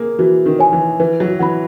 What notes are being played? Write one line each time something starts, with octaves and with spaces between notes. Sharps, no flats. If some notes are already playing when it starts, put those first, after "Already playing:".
Already playing: A#3 G#4
E3 F#4
D#3
C#5 G#5
E3
E3 B4
F#3
E3 F#5 B5